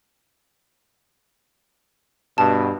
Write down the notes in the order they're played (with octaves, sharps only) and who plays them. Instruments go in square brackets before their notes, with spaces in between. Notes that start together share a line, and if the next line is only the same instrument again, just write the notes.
[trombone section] G2 B2 [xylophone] A5